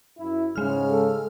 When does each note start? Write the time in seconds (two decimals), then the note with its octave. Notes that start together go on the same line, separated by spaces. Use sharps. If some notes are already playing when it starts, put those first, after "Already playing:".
0.18 F#2 E4
0.56 G#2 C#3 G#3 F6
0.90 A4